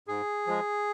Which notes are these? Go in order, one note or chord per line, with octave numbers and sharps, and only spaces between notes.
G#2 G#4
F3 G#3